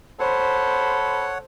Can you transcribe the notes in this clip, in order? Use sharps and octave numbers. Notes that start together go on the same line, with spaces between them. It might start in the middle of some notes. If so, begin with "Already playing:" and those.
A4 C5 C#5 F#5 B5